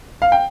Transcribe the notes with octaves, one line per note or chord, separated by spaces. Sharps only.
F5
G5